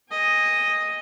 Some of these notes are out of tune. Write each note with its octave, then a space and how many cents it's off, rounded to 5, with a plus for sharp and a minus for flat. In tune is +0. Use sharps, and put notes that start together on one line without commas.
D#5 +0 G#5 -35